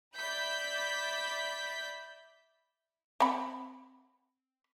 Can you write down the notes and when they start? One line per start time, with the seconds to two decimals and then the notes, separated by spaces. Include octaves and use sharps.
0.16 D5 E5 B5 G6 B6
3.20 C4 F#5 B5